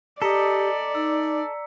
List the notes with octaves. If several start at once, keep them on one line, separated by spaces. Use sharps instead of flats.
G4 A4 D5 D#5 A#5 B6 C#7
D#4 E6